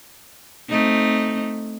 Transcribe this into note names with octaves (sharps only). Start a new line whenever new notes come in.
A3 C4 D#4